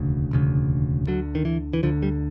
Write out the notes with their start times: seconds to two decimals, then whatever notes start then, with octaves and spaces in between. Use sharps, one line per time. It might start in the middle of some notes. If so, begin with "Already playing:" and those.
Already playing: E1 D2 C#3
0.31 E1 D2 C#3
1.07 D2 D3 F#3
1.35 D#3
1.45 E3
1.73 E3
1.83 D2 D3 F3
2.03 G3